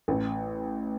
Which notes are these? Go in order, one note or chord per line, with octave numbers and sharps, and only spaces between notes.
A1 A2